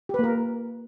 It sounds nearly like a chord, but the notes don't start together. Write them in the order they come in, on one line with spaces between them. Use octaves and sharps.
G4 B4 A#3 A#4